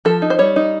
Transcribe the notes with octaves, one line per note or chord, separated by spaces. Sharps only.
F3 A4
D#4
C5
G3 C#5
D#4